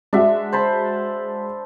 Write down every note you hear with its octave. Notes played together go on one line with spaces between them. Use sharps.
G#3 D4 F#4 E5
C5 A5 B5